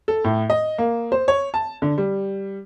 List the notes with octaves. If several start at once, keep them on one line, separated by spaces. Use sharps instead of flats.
A4
A2
D#5
A#3
C5
C#5
A5
D3
G3